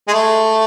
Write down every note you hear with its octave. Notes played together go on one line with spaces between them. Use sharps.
G#3
A3